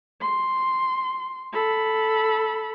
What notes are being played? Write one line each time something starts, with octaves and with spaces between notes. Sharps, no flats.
C6
A4 B5